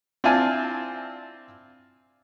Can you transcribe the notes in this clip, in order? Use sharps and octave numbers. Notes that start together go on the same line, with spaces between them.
C4 D4 E4 F4 G#5 A5